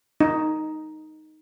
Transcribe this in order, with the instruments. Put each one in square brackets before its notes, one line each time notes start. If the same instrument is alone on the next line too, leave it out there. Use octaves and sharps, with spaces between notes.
[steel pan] D#4